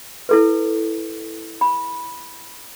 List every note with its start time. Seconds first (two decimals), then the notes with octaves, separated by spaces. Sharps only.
0.29 E4 A4 B4
1.61 B5